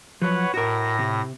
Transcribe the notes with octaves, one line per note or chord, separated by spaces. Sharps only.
F3 F#3 B4 C#5 F#5
A2 F#4 A#4 A#6
C3